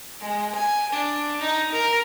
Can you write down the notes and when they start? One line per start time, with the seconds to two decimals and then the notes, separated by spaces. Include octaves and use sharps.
0.20 G#3
0.55 G#5
0.93 D4
1.41 D#4
1.72 A#4